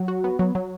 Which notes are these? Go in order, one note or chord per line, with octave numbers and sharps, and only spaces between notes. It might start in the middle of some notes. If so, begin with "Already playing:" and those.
Already playing: F#3
F#4
B3
F#3
F#3